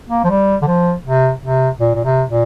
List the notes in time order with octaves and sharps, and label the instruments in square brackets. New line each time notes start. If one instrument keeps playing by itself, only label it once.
[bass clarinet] A#3
F3
G3
D3
F3
C3
C3
A#2
A#2
C3
A#2